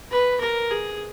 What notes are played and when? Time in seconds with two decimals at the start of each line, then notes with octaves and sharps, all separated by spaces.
0.11 B4
0.41 A#4
0.71 G#4